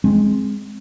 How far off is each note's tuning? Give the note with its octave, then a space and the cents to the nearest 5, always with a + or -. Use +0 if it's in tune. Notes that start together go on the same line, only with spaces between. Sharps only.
G#3 +0 C4 -5